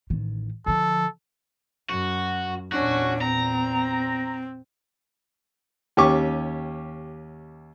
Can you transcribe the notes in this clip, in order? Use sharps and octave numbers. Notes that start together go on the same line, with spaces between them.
A1 D#3
D3 F3 A4
F#2 F#4
E2 A#2 C#4 D4 F#4
C4 A#5
D#2 C#4 G4 C#6 D6